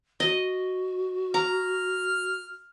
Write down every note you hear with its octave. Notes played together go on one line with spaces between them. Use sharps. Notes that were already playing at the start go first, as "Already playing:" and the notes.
F#4 D#5
A#5 F6